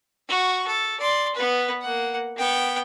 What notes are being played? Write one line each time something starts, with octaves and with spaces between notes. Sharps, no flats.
F#4 C#6
A4
D5 C6
B3 B4
A#3 F#5
B3 G5